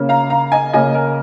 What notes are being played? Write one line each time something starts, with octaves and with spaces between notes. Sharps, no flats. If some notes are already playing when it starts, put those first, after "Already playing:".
Already playing: C#3 A#3 C#4
F5 A#5
F5 A#5
D#5 G#5
C#3 A#3 C#4 D#5 G#5
A#4